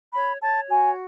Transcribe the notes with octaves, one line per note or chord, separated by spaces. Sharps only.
C#5 B5
C#5 A5
F#4 G#5